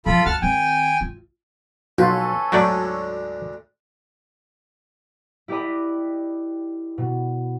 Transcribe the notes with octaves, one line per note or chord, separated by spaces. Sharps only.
C#3 F3 F4 A4 B5
D2 F#5 A5 F6
D#3 C4 G5 G#5
F4
B1 C#4 F4 A4 B4
D2 G#2 D3 F#3 A3 D5
E4 G4 B4 D5 D#5 B5
B2